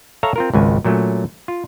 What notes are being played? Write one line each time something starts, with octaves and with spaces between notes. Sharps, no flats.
A4 C#5 E5 F5 A#5
C4 F4 A#4
G#1 C#2 G#5
A#2 F#3 A3 C#4
F4